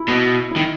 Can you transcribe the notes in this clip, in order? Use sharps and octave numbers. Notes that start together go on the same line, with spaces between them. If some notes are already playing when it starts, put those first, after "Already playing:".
Already playing: E4
B2
E4
D#3